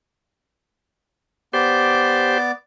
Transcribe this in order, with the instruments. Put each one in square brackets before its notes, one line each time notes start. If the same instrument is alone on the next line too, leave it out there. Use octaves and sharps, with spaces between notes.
[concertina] B3 D5 D6 [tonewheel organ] G4 C5